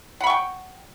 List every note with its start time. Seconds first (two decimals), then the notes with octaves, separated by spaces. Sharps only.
0.21 F#5
0.24 B5
0.27 C#6
0.30 G5